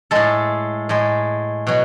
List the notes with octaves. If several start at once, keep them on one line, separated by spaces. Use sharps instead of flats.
A2 G#3 A4
A2 G#3
B2 F#3